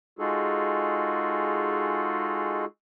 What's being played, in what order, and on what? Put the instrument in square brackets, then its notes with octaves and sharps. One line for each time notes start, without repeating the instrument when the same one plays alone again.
[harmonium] G#3 D#4 F4 F#4 G#4 A4